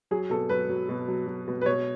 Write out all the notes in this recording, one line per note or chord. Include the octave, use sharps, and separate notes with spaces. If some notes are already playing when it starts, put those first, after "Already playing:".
F#3 G#4
B2 A4
F#3 B4
F#3
B2
F#3
F#3
B2
B4
B2 C#5